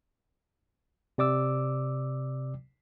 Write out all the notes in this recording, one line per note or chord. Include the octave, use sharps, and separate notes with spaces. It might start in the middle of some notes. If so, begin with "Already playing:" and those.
C3 D5 D6 E6